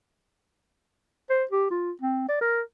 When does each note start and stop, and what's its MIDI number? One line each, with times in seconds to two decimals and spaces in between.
1.30 1.44 72
1.51 1.68 67
1.71 1.91 65
2.02 2.25 60
2.29 2.39 74
2.41 2.61 70